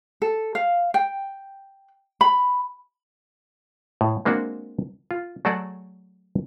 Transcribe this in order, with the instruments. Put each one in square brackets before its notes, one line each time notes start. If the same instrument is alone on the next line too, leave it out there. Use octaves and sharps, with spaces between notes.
[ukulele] A4
F5
G5
B5
[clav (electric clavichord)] A2
G#3 A#3 C4 D4 F#4
F4
F#3 A3 F#4 G#4 A4 D5